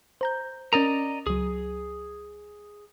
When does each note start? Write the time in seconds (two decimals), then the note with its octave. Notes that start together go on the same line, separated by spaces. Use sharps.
0.21 C5 A#5 G6
0.73 C#4 A#4 D5 D#5 A#5
1.27 C#2 F#3 G#4